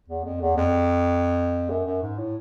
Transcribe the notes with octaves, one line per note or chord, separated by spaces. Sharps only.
E2
F2
E2
F2
F#2
F#2
G#2
A2